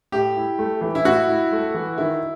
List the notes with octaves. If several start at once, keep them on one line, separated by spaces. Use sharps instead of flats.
A2 G4
E4
A3
E3
E4
A2 F#4
E4
A3
E3
D#3 E4